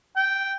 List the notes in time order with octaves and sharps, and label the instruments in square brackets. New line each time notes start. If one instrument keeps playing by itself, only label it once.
[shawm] G5